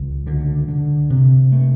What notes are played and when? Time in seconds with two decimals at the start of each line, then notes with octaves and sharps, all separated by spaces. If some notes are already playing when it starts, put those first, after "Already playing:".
Already playing: C#2
0.27 D3
0.68 D3
1.10 C3
1.52 A3